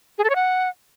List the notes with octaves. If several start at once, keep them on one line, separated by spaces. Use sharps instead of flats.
G#4
A4
C#5
F#5